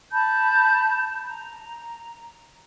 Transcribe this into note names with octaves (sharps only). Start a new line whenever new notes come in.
A5 B5 G6
A#5